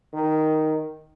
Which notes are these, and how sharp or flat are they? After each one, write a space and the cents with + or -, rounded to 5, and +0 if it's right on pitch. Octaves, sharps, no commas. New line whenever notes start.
D#3 +0